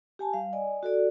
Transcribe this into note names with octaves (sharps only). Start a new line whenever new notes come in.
G4 G#5 A5
G3 F5
D5 D#5 G#5
F#4 A4 D5